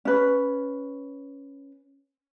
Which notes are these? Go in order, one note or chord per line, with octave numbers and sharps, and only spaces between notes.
C#4 B4